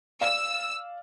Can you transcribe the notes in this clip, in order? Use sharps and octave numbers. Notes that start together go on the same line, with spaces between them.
D5 F5 E6